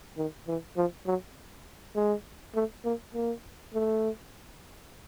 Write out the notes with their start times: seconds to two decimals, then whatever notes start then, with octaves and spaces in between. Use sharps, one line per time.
0.17 D#3
0.47 E3
0.77 F3
1.06 F#3
1.96 G#3
2.55 A3
2.85 A#3
3.14 A#3
3.74 A3